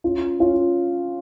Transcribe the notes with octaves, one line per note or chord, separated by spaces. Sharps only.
C#4 F4
C#4 F4